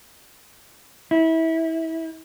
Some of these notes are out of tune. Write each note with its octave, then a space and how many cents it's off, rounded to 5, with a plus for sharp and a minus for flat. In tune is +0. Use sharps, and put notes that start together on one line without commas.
E4 -25